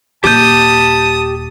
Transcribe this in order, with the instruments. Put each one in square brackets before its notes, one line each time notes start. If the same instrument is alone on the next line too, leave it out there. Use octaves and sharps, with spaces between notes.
[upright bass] D#1 [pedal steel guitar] G4 G6 [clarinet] A5 [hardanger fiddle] D#6